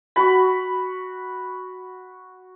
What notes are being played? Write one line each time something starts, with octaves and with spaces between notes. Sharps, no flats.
F#4 B5